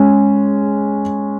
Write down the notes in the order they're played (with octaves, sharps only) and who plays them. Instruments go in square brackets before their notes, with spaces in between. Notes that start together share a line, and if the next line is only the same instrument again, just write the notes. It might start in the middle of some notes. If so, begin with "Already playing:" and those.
Already playing: [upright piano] G#3 C#4